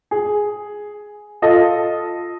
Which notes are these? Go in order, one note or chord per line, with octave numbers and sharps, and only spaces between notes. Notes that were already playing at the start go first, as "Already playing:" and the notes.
G#4
F4 A4 D#5